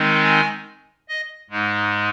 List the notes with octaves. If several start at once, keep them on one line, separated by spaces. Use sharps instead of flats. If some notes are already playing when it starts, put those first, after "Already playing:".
Already playing: D#3 G#3 C4 D#4
G#5
D#5
G#2 G#3 D#4